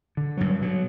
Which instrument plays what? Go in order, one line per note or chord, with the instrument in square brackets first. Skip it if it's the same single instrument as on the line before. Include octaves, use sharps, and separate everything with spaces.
[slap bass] D3
G2 F#3
B2 F#3